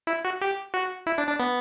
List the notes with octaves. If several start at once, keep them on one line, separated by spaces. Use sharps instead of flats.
E4
F#4
G4
F#4
E4
D4
D4
B3